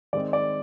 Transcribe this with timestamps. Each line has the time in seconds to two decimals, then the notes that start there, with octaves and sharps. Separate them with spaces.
0.13 D#3 G#3 C4 D5
0.33 D5